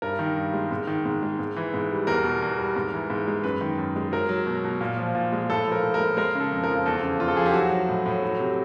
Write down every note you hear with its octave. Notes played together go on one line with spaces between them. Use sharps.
G2 A#4
D#3
G2
G#3
G#2
D#3
G#2
G#3
G#2
E3
G#2
G3
E2 A#4
B2
E2
G3
G#2
E3
G#2
G#3
F#2 B4
D#3
F#2
G#3
F#3 A#4
F#3
B2
B2
A#2
F3
A#2
G#3
A2 A4
F3 A#4
A2
A#4
G#3
G#3 A#4
C#3 A4
F2
A#4
F3
E2 A4
C#3
E2 F4
A4
F3 G#4
G4
F#3 F#4
F#3
A2
A2
F#3
C3